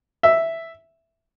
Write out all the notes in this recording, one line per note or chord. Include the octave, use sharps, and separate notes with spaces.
E5